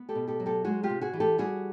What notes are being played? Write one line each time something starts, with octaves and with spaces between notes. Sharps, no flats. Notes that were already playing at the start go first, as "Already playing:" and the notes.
Already playing: B3
G4 A4
B2
G4 A4
F#3
G4 A4
G#3 F#4 G#4
F4 G4
C3
F#4 G#4
E3
G4 A4
G3 F#4 G#4